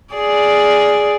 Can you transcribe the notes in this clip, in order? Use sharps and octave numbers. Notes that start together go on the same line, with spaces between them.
G#4 D5